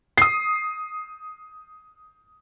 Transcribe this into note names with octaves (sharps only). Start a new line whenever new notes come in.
D#6 C7